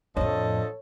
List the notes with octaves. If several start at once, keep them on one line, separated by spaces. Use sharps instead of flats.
F2 A2 F3 D4 A4 C#5 D#5